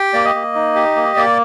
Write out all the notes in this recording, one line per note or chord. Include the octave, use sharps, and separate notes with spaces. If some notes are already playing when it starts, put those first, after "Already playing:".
Already playing: G4 G5
A#3 D5
D#5
A#3
D#4
G4
A#3
A#3 D5